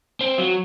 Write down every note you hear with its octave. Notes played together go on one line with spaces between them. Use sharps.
C4
F#3